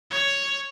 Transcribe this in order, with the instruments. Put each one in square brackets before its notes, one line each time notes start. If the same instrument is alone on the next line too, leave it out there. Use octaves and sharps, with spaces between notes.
[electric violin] C#5